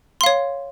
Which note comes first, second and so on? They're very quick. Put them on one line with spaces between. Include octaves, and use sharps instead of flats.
C6 F5 C#5